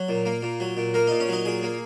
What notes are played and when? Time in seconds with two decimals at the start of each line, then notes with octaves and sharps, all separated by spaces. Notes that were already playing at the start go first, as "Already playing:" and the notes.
Already playing: F#3
0.09 A#2
0.26 A#3
0.43 A#2
0.60 F#3
0.77 A#2
0.94 A#3 A#4
1.07 A#2 D#4
1.20 C#4
1.28 F#3 D#4
1.45 A#2 G#4
1.63 A#3